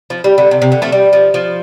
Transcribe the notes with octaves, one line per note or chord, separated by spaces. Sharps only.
F3
G3
D3
C3
C3
D3
F3 A3
G3
F3
F3